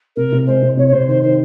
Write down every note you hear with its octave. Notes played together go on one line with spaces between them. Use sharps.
C3 A#4
C3
G#3 C5
C3
C3 C#5
C#5
C3 C5
D#3 C5
D#3 C5